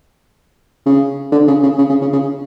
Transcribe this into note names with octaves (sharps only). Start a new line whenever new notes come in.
C#3
D3
C#3
C#3
C#3
C#3
C#3
C#3